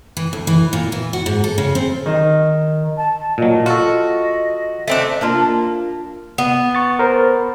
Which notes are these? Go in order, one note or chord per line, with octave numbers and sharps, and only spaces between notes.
E3
D2
E3
A#2
E3
F#4
G#2
A4
C#3
C4
D#3
A5
A#2 F#3 D#5
F4 F#4 A4
A3 C4 D4
A#3 D4 F4
B3
C#6 A6
A#4 C5